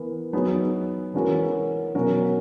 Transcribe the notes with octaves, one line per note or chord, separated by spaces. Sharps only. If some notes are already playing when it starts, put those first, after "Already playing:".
Already playing: E3 B3 A#4
F#3 B3 D#4 G#4
E3 G#3 C#4 F#4 A#4
B2 F#3 C#4 F#4 A#4